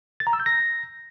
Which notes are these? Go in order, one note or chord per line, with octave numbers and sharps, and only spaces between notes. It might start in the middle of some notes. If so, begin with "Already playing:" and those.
A6
A#5
E6
G6
A#6